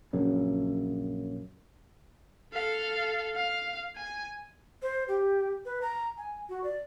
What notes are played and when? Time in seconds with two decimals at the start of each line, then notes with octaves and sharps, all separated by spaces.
0.13 A#1 F#2 C#3
2.54 A4 F5
3.35 F5
3.96 G#5
4.82 C5
5.08 G4
5.65 B4
5.82 A#5
6.18 G#5
6.49 F#4
6.64 D5